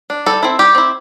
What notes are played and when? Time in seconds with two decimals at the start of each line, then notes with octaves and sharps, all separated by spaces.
0.10 D4
0.26 G3 A4
0.43 C4 E4
0.59 G3 G4
0.75 C4 E4